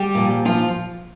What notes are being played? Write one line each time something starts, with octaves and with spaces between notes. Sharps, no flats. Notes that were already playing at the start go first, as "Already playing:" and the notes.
Already playing: G3 G4
A#2 F3
F3 F4